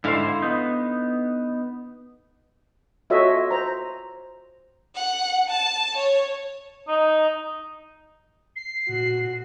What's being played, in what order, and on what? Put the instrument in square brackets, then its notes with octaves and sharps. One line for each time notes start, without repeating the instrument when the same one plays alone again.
[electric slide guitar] G#2 C5 [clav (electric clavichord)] D3 E4 F5
[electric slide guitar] B3 D#4
[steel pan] F4 F#4 A4 C#5 D#5 E5
C5 A#5
[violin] F#5
A5
C#5
[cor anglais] D#4
[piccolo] C7
[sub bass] A#2 [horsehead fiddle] F#4